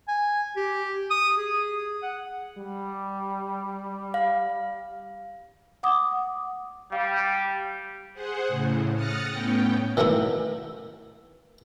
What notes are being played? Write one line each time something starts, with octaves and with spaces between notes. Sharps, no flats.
G#5
G4
D#6
G#4
F#5
G3
F5
F#5 D6 D#6
G3 F5
G#4 C5 F#5
A2 C#3
D#6 F6 F#6 A6 A#6 C#7
A2 B3 C#4 G5
D#3 E3 F#3 A3 E4